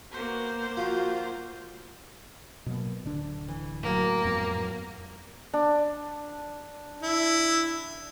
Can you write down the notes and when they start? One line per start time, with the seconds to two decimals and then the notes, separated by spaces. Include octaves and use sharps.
0.12 A#3 B3 F#4 C5
0.77 F3 F4 F#4
2.66 B2 F#3 A#3
3.05 D1 D3 D4
3.48 E3
3.83 A2 F#3 A#3
4.25 F2 G#2 B3
5.53 D4
7.03 E4